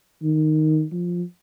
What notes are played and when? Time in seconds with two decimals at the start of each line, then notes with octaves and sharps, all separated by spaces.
0.23 D#3
0.92 F3